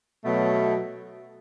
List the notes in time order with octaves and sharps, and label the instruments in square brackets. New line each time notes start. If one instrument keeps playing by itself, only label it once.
[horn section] B2 F#3 A3